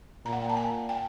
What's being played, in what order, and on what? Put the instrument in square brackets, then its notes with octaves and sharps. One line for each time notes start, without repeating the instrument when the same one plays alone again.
[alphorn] A#2 [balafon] A#5
[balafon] F#5
G5
A5
G#5
G5